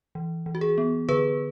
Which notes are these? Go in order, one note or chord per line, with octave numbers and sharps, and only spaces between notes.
E3
E3
F#4
G#4
B3
D3 G#4 B4